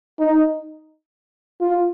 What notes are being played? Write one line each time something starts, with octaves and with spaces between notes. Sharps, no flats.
D#4
F4